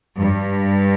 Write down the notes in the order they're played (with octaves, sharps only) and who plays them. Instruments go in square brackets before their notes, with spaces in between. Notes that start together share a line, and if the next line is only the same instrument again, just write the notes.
[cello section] G2